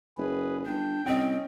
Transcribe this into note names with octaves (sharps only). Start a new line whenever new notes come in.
F#1 G#4 B4
G1 D4 G5
C2 C4 C#4 D#5 G5